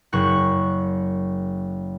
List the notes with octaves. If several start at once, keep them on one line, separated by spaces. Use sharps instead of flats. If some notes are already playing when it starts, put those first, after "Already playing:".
F#1 C#6 F#6